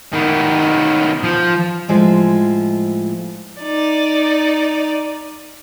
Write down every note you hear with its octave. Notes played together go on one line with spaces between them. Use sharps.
D#3 B3
F3
A2 F3 G#3
D#4 D5